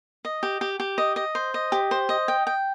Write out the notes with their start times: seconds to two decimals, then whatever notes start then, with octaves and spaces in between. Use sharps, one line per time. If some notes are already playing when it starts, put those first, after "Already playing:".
0.25 D#5
0.43 G4
0.61 G4
0.80 G4
0.98 D#5
1.16 D#5
1.35 C5
1.54 D#5
1.72 G4
1.91 C5
2.09 D#5
2.28 G5
2.47 G5